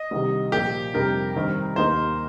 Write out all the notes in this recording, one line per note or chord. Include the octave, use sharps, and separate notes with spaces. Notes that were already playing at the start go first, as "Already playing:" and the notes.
Already playing: D#5
C2 C3 D#3
A#2 F3 A#3 G4
F2 C3 G3 D#4 A#4
G2 D#3 C4
D#2 D#3 A#3 D#4 C5